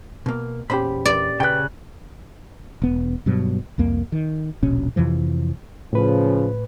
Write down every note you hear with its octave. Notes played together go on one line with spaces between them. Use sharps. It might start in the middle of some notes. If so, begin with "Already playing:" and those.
B2 A#3
E2 A#2 C#4 G4 C5 B5
D5
C#3 B4 G5 F#6
E1 B3
G2 B2 F#3
C2 F2 A#3
D#3
D#1 A#1 B2 C#4
F2 C3 E3 F3
A2 C#3 F3 B4